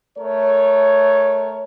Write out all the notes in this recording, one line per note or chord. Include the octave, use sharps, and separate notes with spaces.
A3 A#4 C#5